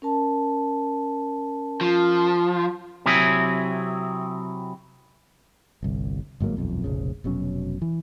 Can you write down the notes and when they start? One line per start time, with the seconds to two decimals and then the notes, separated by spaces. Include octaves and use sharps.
0.02 C#4 A#4 A5
1.81 F3
3.06 C3 F#3 C4 E4 G#4
5.83 G1 C2
6.40 G1 G#2 F#3 A#3
6.57 D#1 B1 F2
6.84 F1 A#1 C#3
7.24 F1 B2 F#3 C#4
7.82 E3